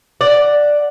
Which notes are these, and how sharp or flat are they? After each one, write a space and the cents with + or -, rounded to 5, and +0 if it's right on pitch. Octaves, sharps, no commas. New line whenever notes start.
D5 +5 F#5 +0